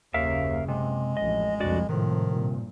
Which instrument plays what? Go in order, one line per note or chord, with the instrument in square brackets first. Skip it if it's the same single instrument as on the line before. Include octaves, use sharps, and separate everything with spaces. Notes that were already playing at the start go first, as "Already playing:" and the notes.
[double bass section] F#1 C#3 [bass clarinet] D#2 [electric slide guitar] A#4 E5 F5
[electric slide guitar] C3 [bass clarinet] G#3
[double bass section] A1 F2 [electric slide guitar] D#5
[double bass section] F1 C2 F2 [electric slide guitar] D4 F#4 D5
[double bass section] G#1 A2 F3 [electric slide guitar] C3 [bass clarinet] D#3
[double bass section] G2 A#2